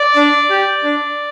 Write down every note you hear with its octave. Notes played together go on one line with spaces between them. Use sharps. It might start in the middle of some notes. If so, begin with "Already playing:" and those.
Already playing: D5
D4
G4
D4